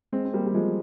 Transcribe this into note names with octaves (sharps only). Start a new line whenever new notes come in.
G#3 C4
C4
G3 A#3
G3
F3 G#3